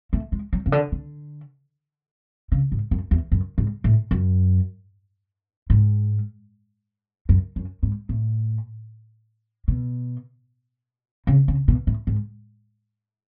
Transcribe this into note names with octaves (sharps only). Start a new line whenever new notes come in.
A3
G#3
F#3
C#3
D3
D3
C#3
G#2
F#2
E2
F#2
G#2
A2
F#2
G#2
F#2
F#2
G#2
A2
B2
C#3
C#3
B2
A2
G#2